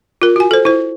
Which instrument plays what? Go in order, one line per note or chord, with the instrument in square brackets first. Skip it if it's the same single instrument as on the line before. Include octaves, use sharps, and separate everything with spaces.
[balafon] F4 A#4
F#4 G#5
A4 C5
E4 C5